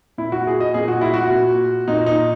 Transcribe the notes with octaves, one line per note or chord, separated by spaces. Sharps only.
A#2 E4
F#4
G#4
D#5
A#2 G#4
F#4
E4
F#4
A#2
A#2 D#4
D#4